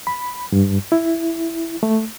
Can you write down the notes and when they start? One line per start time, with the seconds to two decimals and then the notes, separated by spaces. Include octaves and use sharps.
0.07 B5
0.52 G2
0.92 E4
1.83 A3